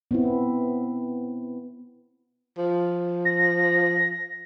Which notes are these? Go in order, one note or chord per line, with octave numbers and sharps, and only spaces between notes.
B3 C4 E4
F3
A#6